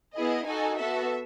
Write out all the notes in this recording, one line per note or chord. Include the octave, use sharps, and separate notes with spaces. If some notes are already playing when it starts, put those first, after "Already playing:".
B3 E4 G#4 D#5
D#4 F#4 A4 G#5
B3 F#4 A4 E5